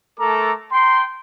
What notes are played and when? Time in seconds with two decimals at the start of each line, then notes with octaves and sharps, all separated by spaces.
0.19 A3 A4 A#4 A#5 D6
0.72 G5 A#5 C6